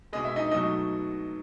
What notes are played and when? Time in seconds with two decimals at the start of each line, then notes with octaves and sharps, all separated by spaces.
0.13 B2 G#3 D#5
0.24 E5
0.36 D#4 D#5
0.51 B2 F#3 A3 D#4 D#5